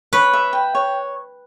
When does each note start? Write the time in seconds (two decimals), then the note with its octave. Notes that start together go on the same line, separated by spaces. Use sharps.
0.13 B4 C#5
0.33 E5
0.53 G5
0.75 C#5